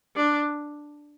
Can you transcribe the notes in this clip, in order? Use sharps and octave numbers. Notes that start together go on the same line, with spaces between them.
D4